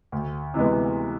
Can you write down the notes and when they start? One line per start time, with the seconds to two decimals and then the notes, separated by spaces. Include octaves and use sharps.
0.12 D2
0.54 C3 E3 G#3 B3